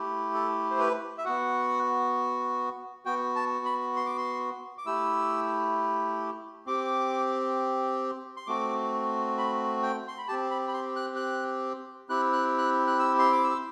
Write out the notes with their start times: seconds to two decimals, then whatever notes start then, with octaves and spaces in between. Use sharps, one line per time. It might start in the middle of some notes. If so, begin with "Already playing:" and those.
Already playing: A3 E4 G4
0.34 A4
0.71 C5
0.79 B4
1.18 E5
1.25 B3 F#4 F#5
3.05 B3 F#4 G5
3.36 A5
3.65 B5
3.96 C6
4.06 D6
4.18 C6
4.78 D6
4.86 A3 E4 G4 E6
6.66 C4 G4 D6
8.37 C6
8.47 A3 C4 F#4 D6
9.38 B5
9.83 G5
10.08 C6
10.18 B5
10.28 C4 G4 A5
10.51 B5
10.68 B5
10.73 C6
10.96 F#6
11.16 F#6
12.09 C4 E4 G4 F#6
12.33 F#6
12.58 F#6
12.87 F#6
12.99 E6
13.19 C6
13.32 D6
13.44 E6